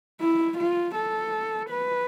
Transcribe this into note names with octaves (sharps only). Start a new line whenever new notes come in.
E4
F4
A4
B4